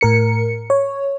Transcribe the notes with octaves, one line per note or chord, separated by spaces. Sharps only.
A2 A#4 C#7
C#5